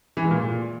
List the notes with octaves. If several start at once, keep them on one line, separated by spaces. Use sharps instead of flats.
E3
G#3
A#2